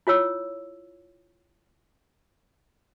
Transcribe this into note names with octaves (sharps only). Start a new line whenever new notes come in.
E4 F4 C#5 E6